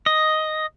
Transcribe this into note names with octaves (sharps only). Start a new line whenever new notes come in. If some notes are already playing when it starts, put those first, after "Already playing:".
D#5